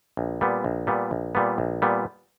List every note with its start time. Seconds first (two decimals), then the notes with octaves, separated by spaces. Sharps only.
0.17 A#1
0.41 A#2 G3 B3
0.64 A#1
0.87 A#2 G3 B3
1.11 A#1
1.35 A#2 G3 B3
1.58 A#1
1.82 A#2 G3 B3